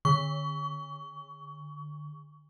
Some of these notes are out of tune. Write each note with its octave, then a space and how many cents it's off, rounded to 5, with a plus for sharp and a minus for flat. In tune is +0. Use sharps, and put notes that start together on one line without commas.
D3 +25 C#6 +25